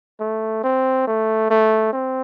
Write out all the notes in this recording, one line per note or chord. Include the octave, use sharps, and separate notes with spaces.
A3
C4
A3
A3
C4